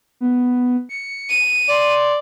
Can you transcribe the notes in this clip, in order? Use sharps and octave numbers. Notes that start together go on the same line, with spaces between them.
B3
C#7
D#7
D5 C6